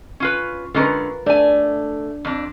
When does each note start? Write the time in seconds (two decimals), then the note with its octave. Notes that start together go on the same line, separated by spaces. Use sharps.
0.20 C#4 F4 B4
0.75 D3 G#3 C#4 F4 A#4 B4
1.26 A3 D4 G#5
2.25 F2 D4